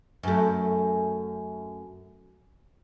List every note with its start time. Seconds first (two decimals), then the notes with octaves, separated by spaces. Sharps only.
0.23 F#2 A3